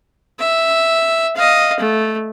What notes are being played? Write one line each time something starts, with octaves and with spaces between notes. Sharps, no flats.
E5
D#5 F5
A3